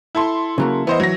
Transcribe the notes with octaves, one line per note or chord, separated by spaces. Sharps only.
E4 A4 C6
C#3 F#3 A#3
E3 B3 C5 D#5
F#3 A#6